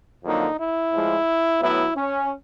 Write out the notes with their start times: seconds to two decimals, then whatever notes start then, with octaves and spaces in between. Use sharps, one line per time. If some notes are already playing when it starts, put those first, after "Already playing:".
0.23 F2 D3 F#3 A#3 D#4
0.58 E4
0.92 A2 F3 G#3
1.61 A2 F#3 B3 E4
1.95 C#4